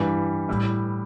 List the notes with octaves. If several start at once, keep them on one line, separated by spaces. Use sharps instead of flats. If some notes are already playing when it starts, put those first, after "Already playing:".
Already playing: G2 E3 G3
A2 G3 E4